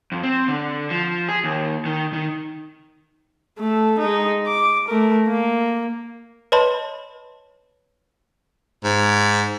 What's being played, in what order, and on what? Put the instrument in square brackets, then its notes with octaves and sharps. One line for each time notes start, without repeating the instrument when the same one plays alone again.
[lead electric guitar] F2
C4
D3
F3
G#4
D#2
D#3
D#3
[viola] A3 A4
G#3 D#4
D6
A3 A#4
A#3
[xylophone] B4 C#5 D#5 A5 B5 C6
[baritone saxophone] G#2